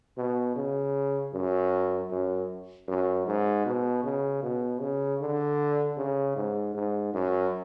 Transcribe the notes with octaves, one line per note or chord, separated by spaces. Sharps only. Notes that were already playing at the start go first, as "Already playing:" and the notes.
B2
C#3
F#2
F#2
F#2
G#2
B2
C#3
B2
C#3
D3
C#3
G#2
G#2
F#2